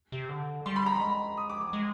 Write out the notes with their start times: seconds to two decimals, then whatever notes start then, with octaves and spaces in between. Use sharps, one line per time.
0.12 C3
0.29 D3
0.66 G3 C6
0.76 B5
0.86 A#5
0.96 G#3 B5
1.37 D#6
1.50 D6
1.61 D6
1.73 G#3